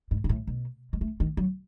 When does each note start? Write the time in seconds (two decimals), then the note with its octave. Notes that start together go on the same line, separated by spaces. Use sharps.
0.11 G#2
0.24 G#2
0.29 A2
0.47 B2
0.93 G#3
1.01 A3
1.20 D#3
1.37 F#3